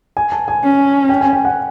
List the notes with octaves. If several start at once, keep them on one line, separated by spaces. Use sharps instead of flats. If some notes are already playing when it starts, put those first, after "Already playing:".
G#5
A5
G#5
C#4
G5
G#5
G5
F#5